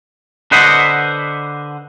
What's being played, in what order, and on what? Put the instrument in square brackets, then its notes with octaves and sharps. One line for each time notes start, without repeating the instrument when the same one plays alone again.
[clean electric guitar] D3 B4 C5 D#5 F#5